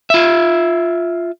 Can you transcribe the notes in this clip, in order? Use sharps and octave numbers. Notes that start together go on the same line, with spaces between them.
F4 E5